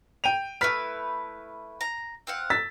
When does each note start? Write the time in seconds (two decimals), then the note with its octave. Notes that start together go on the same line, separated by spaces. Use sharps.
0.24 G5 D#7 F7
0.61 A3 E4 B4 F6 B6
1.81 A#5
2.27 C4 F5 F#5
2.50 E6 A6 B6